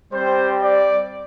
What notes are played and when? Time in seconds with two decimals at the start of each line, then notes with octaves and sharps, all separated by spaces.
0.12 G3 C4 G4 C5
0.63 D5